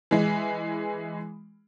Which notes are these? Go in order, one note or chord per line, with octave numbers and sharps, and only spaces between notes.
E3 G#3